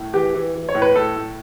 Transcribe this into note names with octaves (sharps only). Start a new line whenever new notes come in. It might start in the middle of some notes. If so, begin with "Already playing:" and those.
Already playing: A2
E3 G4
E3
E3
C#5
A2
B4
A2 A4
A2